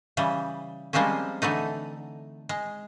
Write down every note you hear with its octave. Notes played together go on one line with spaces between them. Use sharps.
C#3 E3 G3
F3 G3 G#3 A#3 C4 C#4
D3 E3 A3 D#4
G#3